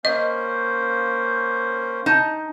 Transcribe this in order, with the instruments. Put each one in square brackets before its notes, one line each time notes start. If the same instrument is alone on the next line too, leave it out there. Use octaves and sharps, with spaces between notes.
[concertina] A#3 C#4 C5 [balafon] D#5
[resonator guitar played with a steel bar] D#4 A5